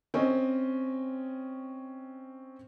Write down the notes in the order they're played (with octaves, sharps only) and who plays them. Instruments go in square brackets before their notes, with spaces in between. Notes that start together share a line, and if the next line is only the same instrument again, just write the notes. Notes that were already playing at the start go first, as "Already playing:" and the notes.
[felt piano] C4 C#4 D#5